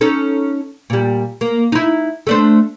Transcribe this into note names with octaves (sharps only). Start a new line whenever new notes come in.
C#4 D#4 A4
A#2 G3
A#3
D#4 E4
A3 D4 C5